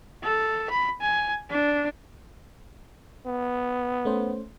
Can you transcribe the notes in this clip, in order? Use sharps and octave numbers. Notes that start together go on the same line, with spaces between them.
A4
B5
G#5
D4
B3
A3 C#4 C5